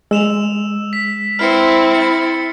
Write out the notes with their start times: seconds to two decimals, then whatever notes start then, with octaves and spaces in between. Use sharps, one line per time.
0.11 G#3 E6 E7 F7
0.93 B6
1.39 C4 E4 F6 C7 C#7
1.94 A6 C#7